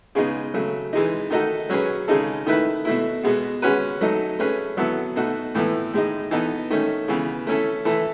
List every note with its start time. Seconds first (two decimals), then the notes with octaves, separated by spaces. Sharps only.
0.15 C#3 G#3 B3 D#4
0.54 C#3 F#3 A3
0.93 E3 G#3 D#4
1.30 D#3 A3 D#4 F#4 A4
1.70 F#3 C#4 G#4 B4
2.08 C#3 G#3 D#4 A4
2.46 D#3 A3 E4 B4
2.85 B2 A3 E4
3.24 B2 G#3 B3
3.62 G#3 C#4 F#4 B4
4.01 F#3 A3 D#4 A4
4.39 A3 C#4 G#4 B4
4.77 F#3 B3 E4 A4
5.16 B2 A3 D#4 F#4 A4
5.54 A2 E3 B3 E4 A4
5.93 A2 G#3 D#4
6.31 E3 B3 D#4 A4
6.70 D#3 A3 C#4
7.08 C#3 E3 B3
7.47 A3 C#4 E4 A4
7.85 E3 A3 E4 A4